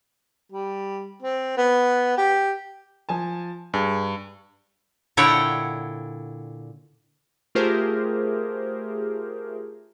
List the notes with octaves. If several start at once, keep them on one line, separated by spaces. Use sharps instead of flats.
G3
C4
B3
G4
F3 G#5 A5
G2 G#4
A#2 D3 E4 C#5 F#5 G5
A3 F4 G4 G#4 A#4 C5